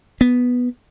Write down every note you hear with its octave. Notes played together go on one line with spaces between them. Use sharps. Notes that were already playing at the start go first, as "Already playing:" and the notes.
B3